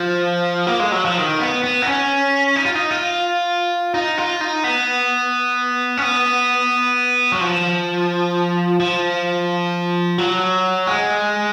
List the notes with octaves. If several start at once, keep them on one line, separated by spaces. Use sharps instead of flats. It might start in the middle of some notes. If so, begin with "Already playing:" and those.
Already playing: F3
A#3
G#3
F#3
F3
D#3
B3
B3
D#4
C#4
D#4
F4
D#4
F4
D#4
F4
D#4
B3
C#4
B3
F#3
F3
F3
F#3
G#3